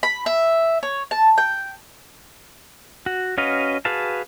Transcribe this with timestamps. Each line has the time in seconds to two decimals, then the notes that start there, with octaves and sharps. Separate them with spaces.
0.03 B5
0.26 E5
0.83 C#5
1.11 A5
1.38 G5
3.06 F#4
3.38 C#4 F#4 B4 D#5 F5
3.85 F#4 G#4 B4 F5 A5